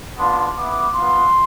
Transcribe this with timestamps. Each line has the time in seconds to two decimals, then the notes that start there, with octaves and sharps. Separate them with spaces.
0.18 B3 D4 F4 C6
0.56 B3 E4 D6
0.94 B3 F4 C6